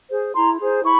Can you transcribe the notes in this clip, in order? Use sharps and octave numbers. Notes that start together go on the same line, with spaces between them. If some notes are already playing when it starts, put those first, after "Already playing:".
G#4 C5
E4 A#5 C6
G#4 C5
E4 B5 C#6